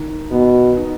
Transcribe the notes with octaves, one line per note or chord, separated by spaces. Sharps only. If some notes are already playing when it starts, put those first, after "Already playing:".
Already playing: D#3
B2 B3
D#4